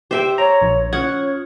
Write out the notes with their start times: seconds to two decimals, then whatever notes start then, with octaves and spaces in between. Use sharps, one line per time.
0.11 G4 C5 E5 G5
0.38 C#5 A#5
0.62 A#1
0.93 C#4 F4 C#5 F#5 D#6 G#6